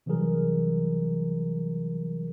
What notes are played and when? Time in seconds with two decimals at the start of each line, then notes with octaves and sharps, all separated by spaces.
0.06 C3 E3 F#3 G3 G#4 A#4